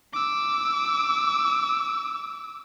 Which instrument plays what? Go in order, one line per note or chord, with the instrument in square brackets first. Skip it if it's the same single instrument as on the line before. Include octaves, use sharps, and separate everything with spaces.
[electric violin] D6 E6